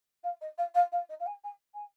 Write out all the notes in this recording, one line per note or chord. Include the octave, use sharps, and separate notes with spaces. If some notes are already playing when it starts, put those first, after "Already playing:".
F5
D#5
F5
F5
F5
D#5
F5
G#5
G#5
G#5